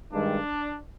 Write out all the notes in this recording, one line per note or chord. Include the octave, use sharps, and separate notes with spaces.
G2 D#3 G#3 D4